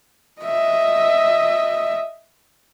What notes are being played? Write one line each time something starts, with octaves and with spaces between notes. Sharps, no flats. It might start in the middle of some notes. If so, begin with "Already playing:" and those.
D#5 E5